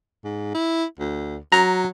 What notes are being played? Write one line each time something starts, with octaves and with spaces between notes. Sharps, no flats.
G#2
E4
D2
F#3 A#5